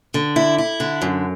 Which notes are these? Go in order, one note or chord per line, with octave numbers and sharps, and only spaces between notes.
D3
E4
E4
D3
F#2